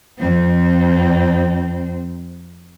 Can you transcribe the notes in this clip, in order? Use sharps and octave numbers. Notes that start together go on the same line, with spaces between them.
F2 C4